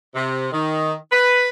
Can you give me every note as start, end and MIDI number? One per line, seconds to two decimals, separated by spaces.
0.15 0.47 48
0.52 0.93 51
1.12 1.49 71